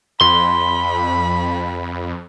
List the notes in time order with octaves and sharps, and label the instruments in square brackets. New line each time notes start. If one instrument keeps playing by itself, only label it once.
[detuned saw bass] F2 [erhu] B5 [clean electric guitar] C6